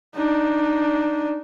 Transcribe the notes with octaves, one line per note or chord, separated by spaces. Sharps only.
D4 D#4